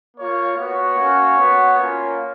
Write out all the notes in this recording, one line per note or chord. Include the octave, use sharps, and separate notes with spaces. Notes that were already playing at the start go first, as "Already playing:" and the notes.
A#3 F4 C#5
B3 F#4 C#5
A#3 C#4 F#4
B3 F#4
A#3 C#4 F4